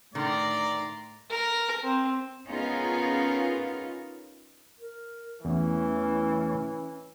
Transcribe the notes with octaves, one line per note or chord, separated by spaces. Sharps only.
A2 D3 D#3 D5 A#5 C6
A#4
C4
B3 C#4 D#4 F4 G#4 A#4
A#4
E2 E3 A3 C#4